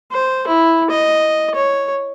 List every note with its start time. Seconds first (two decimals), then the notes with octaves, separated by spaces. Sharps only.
0.12 C5
0.47 E4
0.90 D#5
1.55 C#5